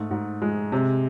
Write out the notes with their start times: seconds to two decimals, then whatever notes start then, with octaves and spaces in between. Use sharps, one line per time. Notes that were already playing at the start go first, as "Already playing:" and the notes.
Already playing: G#2 A3
0.11 G#2
0.42 G#3
0.72 C3